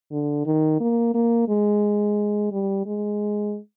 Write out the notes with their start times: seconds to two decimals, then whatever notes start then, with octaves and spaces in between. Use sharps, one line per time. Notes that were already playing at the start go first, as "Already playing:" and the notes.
0.12 D3
0.46 D#3
0.80 A#3
1.15 A#3
1.49 G#3
2.52 G3
2.86 G#3